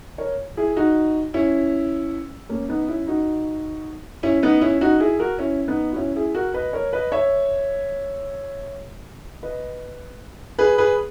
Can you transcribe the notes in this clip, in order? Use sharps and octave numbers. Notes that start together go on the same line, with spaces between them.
A#4 C#5
E4 G#4
D#4 F#4
C#4 E4
A#3 C#4
B3 D#4
C#4 E4
D#4 F#4
C#4 E4
B3 D#4
C#4 E4
D#4 F#4
E4 G#4
F#4 A#4
C#4 E4
B3 D#4
F#4
C#4 E4
E4 G#4
F#4 A#4
B4 D#5
A#4 C#5
B4 D#5
C#5 E5
B4 D#5
G#4 B4
G#4 B4